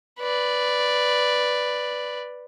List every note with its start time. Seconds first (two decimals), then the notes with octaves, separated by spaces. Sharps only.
0.20 B4 D5